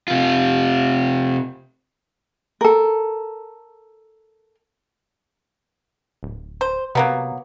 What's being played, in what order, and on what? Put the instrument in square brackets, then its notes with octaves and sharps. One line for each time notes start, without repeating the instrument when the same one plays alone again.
[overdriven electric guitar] C3 F4
[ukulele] A4 A#4
[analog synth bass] D1
[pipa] C5
[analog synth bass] C3 [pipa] F#3 A#3 B3